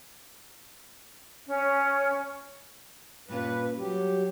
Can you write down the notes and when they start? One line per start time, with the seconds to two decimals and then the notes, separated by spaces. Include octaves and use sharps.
1.48 C#4
3.29 G2 A#2 C#4 B4
3.77 F#3 G3 G4